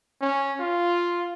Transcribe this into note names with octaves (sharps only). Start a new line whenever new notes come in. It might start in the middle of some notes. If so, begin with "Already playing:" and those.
C#4
F4